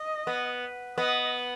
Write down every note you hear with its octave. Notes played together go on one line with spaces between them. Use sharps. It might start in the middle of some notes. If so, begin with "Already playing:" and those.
Already playing: D#5
B3
B3 D#5